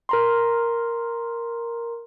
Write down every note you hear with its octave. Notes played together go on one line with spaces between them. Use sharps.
A#4 A#5 C6